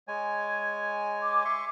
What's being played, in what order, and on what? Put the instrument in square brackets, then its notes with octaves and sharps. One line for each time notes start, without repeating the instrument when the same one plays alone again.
[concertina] G#3 C#5 G#5
[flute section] D6
[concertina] E5 C6 C#6